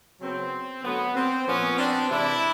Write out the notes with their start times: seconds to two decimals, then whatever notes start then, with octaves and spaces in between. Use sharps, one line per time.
0.21 C#3 F#3 B3 C4
0.83 D3 F#3 A3 B3
1.15 C4
1.46 A#2 F3 A#3 B3 C#4
1.78 C4 D4
2.10 C3 E3 G#3 D4 E4